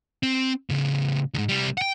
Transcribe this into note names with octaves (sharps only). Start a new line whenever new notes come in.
C4
A2 C#3
D2 G#2
C2 G3
F#5 G5